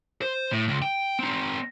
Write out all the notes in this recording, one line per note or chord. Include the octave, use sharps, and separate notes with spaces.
C5
A2
C#2
G5
C4 D#4